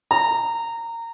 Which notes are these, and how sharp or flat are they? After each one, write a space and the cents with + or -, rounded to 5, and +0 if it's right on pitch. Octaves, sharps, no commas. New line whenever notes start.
A#5 -20